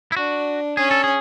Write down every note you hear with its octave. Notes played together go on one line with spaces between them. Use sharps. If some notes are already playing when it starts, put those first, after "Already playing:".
E4
D4 F#4
C#4 G#4
A4
G#4